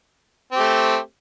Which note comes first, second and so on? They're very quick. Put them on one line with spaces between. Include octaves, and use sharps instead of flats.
C4 G4 A3